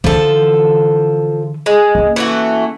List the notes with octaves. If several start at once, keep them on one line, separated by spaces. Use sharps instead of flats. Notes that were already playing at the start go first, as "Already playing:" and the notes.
D3 E3 F3 A4
G#3
A#3 C#4
E3 A3 F#4